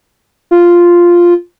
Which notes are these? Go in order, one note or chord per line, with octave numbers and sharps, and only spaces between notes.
F4